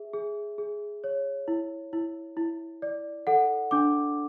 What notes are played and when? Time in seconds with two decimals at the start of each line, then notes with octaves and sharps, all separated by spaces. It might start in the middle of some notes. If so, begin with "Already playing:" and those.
Already playing: G#4 E5
0.14 G#4
0.58 G#4
1.04 C#5
1.48 E4
1.93 E4
2.37 E4
2.82 D5
3.27 A4 F#5
3.71 D4 D6